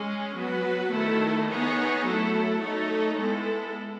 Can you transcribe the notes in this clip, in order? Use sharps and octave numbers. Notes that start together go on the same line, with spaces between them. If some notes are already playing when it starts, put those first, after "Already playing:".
Already playing: G#3 C#4 G#4
F#3 B3 F#4 B4
D#3 A3 E4 A4
B3 D#4 G#4 C#5
F#3 A3 E4 A4
A3 D#4 A4 C#5
G#3 B3 E4 A4